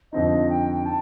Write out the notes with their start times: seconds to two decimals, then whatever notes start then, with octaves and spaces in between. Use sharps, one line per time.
0.12 F2 D3 F3 C4 D#4 D#5
0.50 G5
0.85 D#4 A5